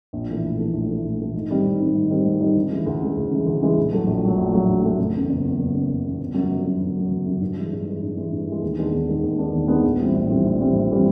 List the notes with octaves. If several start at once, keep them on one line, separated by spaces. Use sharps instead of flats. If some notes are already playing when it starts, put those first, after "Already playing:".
A#1
A2 E3 A3
A#1
A2 E3 A3
A#1
A2 E3 A3
A#1
A2 E3 A3
G#2
D#3 G3 C4 D#4
G#2
D#3 G3 C4 D#4
G#2
D#3 G3 C4 D#4
G#2
D#3 G3 C4 D#4
D2
C#3 E3 G#3
D2
C#3 E3 G#3
D2
C#3 E3 G#3
D2
C#3 E3 G#3
A#1
A2 F#3 A3
A#1
A2 F#3 A3
A#1
A2 F#3 A3
A#1
A2 F#3 A3
F#1
E2 C#3
F#1
E2 C#3
F#1
E2 C#3
F#1
E2 C#3
G1
F#2 C#3 F#3
G1
F#2 C#3 F#3
G1
F#2 C#3 F#3
G1
F#2 C#3 F#3
G2
E3 G#3
G2
E3 G#3
G2
E3 G#3
G2
E3 G#3
D#2
D#3 G#3 B3 D4
D#2
D#3 G#3 B3 D4
D#2
D#3 G#3 B3 D4
D#2
D#3 G#3 B3 D4
A#1
A2 E3 G3 C4
A#1
A2 E3 G3 C4
A#1
A2 E3 G3 C4
A#1
A2 E3 G3 C4